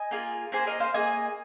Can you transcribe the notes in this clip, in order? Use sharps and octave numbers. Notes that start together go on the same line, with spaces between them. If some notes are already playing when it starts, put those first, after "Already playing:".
Already playing: D#5 G#5
A#3 F4 G#4
A#3 G#4 C5
A#4 D#5
C5 F5
A#3 G#4 D#5 G#5